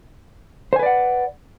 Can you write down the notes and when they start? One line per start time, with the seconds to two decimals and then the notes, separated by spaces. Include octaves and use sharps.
0.73 C5
0.76 G#5
0.79 B4
0.83 D5
0.86 F#5